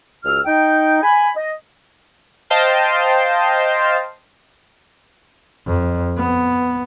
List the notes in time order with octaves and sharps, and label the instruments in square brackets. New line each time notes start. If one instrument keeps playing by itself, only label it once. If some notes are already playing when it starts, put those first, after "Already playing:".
[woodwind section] C#2 F#4 E6 F6
D#4 G5
G#5 B5
D#5
[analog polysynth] C5 D#5 F5 G5 A5 C6
[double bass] F2
B3